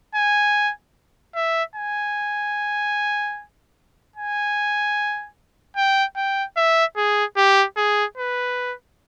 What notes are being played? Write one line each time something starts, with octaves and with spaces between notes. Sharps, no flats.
G#5
E5
G#5
G#5
G5
G5
E5
G#4
G4
G#4
B4